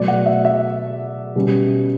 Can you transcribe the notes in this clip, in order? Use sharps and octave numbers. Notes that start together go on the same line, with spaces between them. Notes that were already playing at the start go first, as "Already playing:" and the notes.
Already playing: B2 F#3 A3 D5
F#5
E5
E5
B2 G3 C#4